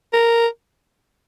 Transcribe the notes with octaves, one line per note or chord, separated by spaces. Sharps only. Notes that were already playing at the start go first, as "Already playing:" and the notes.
A#4